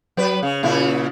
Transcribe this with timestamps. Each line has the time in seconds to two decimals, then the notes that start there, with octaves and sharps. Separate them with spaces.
0.17 F#3 B4
0.43 C#3
0.63 A#2 C#3 E4